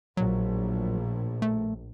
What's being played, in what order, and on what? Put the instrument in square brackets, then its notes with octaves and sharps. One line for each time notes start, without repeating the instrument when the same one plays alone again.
[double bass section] A#1 A2 [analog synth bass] F#3
[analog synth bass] A3